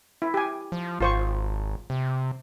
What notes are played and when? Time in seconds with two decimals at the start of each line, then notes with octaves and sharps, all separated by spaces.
0.22 E4
0.34 G4 G#5
0.72 F3
1.01 G#1 F4 C5 C#6
1.90 C3